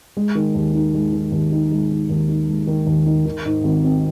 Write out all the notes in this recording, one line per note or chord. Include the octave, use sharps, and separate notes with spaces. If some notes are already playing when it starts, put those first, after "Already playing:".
G#3
D#3
D#2
D#4
G#3
D#3
D#2
D#4
G#3
D#3
D#2
D#4
G#3
D#3
D#2
D#4
D#3
G#2
G#1
C4